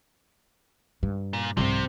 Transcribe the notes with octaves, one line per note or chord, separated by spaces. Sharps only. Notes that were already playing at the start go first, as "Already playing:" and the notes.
G2 D#4
A#2
C2 G#2 C3 F3 C4